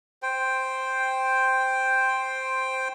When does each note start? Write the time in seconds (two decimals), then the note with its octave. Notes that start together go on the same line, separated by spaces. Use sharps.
0.23 C5 G5